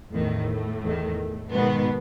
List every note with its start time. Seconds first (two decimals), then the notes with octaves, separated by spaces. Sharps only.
0.12 E2 A2 D#3 A3
0.83 E2 D#3
1.52 G#2 B2 D#3 B3